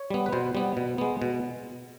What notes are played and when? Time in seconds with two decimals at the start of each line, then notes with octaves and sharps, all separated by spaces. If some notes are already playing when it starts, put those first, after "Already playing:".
Already playing: C#5
0.10 G3 B3
0.26 B4
0.33 B2 C5
0.55 G3 B3
0.77 B2
0.98 G#3 B3
1.22 B2